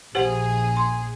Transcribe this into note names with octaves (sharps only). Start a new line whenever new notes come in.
A#1 G4 G#4 C5 F#5
C6